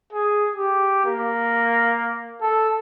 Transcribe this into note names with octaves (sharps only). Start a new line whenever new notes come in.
G#4
G4
A#3
A4